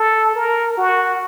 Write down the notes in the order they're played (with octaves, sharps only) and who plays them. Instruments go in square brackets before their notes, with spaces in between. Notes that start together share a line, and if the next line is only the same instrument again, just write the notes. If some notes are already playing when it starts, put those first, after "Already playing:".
Already playing: [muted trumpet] A4
A#4
F#4